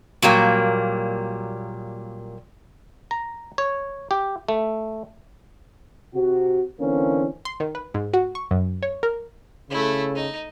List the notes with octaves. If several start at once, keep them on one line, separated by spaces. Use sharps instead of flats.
A#2 F#3 G3 A#3
A#5
C#5
G4
A3
C3 F#4
D3 E3 A#3 C4 C#4
C6
D#3
B4
G#2
F#4
C#6
F#2
C#5
A#4
C#3 A3 E4
D#4